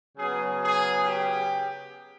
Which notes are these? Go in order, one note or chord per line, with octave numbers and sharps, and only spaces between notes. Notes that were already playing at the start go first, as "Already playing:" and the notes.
C#3 F#3 B3 G#4
G#4
G4